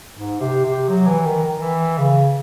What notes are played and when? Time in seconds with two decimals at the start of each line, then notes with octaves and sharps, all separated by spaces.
0.15 G#2
0.40 C3
0.64 C3
0.88 F#3
1.07 E3
1.26 D#3
1.43 D#3
1.61 E3
1.98 C#3